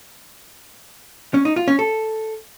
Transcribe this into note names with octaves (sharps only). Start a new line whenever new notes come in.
C#4
D#4
F4
C#4
A4